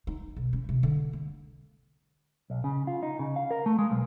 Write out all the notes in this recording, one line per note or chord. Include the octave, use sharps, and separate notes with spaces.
D#4
B1
C#4
C3
D3
A#3
B1
C#3
F4
D#4
C#3
F5
A#4
A3
G#3
B1